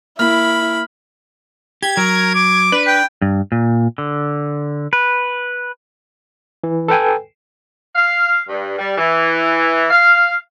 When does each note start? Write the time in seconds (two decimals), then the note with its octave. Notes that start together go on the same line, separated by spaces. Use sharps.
0.19 A#3 E4 B5 F6
1.82 G4 G#6
1.97 F#3 A#4
2.35 D6
2.72 D4 B4
2.87 G5
3.22 G2
3.52 A#2
3.98 D3
4.93 B4
6.64 E3
6.88 A4 B4 G5 G#5
7.96 F5
8.49 G2
8.79 G3
8.98 E3
9.91 F5